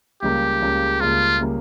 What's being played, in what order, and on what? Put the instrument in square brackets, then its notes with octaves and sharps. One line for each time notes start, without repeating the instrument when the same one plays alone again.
[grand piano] C#2 C#3 G3 A#3 [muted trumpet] G4
[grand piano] C#2 C#3 G3 A#3
[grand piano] C#2 C#3 G3 A#3 [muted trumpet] F4
[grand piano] C#3 G3 A#3